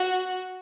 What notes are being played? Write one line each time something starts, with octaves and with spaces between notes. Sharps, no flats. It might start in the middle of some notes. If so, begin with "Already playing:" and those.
Already playing: F#4